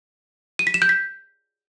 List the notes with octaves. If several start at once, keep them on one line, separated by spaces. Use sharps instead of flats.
D#7
B6
E7
G6
B6